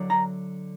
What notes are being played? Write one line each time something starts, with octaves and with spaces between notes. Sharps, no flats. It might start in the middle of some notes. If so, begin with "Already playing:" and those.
Already playing: D3 F#3 D4
A#5